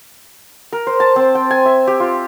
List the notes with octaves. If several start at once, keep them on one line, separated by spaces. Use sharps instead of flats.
A#4
C5
A5
C4
G5
G#5
E5
G4
F4